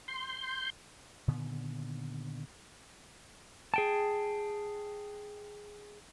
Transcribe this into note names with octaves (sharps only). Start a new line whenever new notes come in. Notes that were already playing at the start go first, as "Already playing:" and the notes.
C6 G6
A#2 D3 D#3 B3
G#4 G5 A5